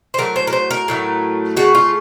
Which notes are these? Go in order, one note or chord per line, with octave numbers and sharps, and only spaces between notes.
C5
A2 F#3 A3 A#4
C5
A#4
C5
A#4
A2 F#3 A3
C#3 A3 F#4
F4